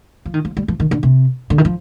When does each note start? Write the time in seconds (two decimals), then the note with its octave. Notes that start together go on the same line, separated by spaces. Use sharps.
0.25 F3
0.34 D#3
0.45 F3
0.57 G3
0.68 F3
0.80 D#3
0.91 D3
1.03 C3
1.50 D3
1.58 D#3
1.65 F3